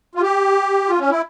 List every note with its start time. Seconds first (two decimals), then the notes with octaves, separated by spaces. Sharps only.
0.15 F4
0.22 G4
0.88 F4
0.99 C#4
1.10 E4